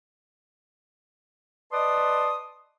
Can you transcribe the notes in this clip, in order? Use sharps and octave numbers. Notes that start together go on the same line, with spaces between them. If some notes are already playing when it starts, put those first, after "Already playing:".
B4 D5 D#5 A5 C6 D#6